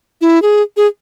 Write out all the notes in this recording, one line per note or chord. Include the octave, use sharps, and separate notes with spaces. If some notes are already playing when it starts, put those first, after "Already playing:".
E4
G#4
G#4